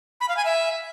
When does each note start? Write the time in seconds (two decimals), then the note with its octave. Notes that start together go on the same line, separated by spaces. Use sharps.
0.21 B5
0.29 F5
0.37 G#5
0.45 E5